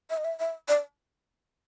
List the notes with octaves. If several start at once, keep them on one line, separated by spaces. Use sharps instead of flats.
E5
D#5
E5
E5
D5